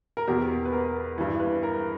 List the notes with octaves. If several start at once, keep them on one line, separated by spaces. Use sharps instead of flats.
A#4
E2 B2 G4
B4
A#4
G2 E3
B4
A#4